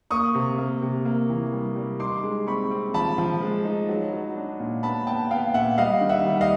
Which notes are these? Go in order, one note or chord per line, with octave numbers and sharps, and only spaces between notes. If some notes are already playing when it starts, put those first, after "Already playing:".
A#3 C#6 D#6
C3
A#3
C3
A#3
E3
G3
G3
D#4 C6 D6
G#3
C4 B5 C#6
C4
F3 A5 B5
F3
G#3
D#4
F#3
F#3
D4
A#2
B3 A5 B5
B3 G5 A5
B3 F5 G5
A#2 E5 F#5
G3 D#5 F5
D#3
E5 F#5
G3
D#5 F5